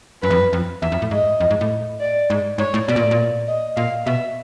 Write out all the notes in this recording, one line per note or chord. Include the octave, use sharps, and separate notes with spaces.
F#2 B4
F2
F#2
F2
E2 E5
F2
A2
G#2 D#5
F2
G#2
A2
D5
G#2
G#2 C#5
A2
B2 D5
A#2
A2
A#2
D#5
A#2 F5
B2 E5